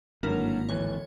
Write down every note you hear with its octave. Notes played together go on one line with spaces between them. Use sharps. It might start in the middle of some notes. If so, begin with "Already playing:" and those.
G#1 G2 D3 F#3 A#3 E4 A#4
D1 E3 C#5